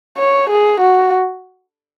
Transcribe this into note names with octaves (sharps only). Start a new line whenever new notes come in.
C#5
G#4
F#4